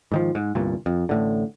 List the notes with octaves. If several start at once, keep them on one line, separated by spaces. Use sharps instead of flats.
G#2 D#3 F3
G#2
G1 C2 G2 A#2
F2
A1 A2 D3